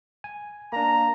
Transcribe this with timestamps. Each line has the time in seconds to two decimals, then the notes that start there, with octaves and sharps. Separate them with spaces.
0.24 G#5
0.73 A#3 D4 A#5